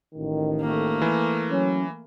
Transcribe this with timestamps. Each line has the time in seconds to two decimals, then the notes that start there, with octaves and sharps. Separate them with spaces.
0.15 A1 F2 D#3
0.60 A3 A#3
1.02 E3
1.50 F#3 C#4